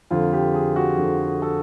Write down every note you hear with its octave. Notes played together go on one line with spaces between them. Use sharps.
F2 D3 F4
G4
G#4
F#4
F2 D3
A4